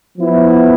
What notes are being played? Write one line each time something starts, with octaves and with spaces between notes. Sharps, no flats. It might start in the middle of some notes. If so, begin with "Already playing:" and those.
F3 B3 E4